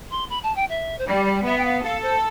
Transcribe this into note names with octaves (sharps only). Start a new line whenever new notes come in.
C6
B5
A5
G5
E5
C5
G3 D5
D5
B3 E5
G5
F5
A4 F5
C5